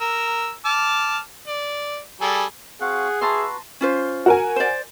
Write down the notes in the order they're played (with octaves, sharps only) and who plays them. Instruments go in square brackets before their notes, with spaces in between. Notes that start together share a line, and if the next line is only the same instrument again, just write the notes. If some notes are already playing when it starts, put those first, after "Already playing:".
[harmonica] A#4 E6
A5 D6 F6
D5
G3 G#4 A4
[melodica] C4 F#4 F5 [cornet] G#4 [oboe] F#5
[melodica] F#4 B4 [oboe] E5 [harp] A5 A#5 C6
[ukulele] C#4 F4 C5
[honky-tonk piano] F#4 A#4 G#5
[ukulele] C5 D5